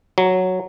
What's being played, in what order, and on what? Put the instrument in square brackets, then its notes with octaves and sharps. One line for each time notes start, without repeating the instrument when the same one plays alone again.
[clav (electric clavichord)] F#3